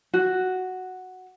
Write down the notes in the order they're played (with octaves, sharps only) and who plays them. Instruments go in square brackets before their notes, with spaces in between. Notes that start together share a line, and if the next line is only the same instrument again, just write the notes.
[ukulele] F#4